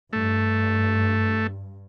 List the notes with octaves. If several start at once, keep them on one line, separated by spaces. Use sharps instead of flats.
G2 A3